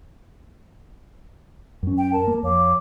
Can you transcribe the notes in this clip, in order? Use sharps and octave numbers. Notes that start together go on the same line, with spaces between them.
F#2 C#4
G5
A#4 A5
A#3
F2 C#5 F5 D6